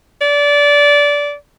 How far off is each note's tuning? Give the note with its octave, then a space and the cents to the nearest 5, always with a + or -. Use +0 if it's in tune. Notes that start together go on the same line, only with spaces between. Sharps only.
D5 -20